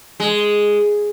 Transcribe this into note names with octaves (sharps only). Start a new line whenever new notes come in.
G#3